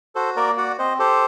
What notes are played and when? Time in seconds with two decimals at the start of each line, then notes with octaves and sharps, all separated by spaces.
0.15 F#4 A4 C5
0.36 A#3 A#4 D5
0.58 F#4 D5 F#5
0.78 C4 C5 D#5
0.99 G4 A4 C5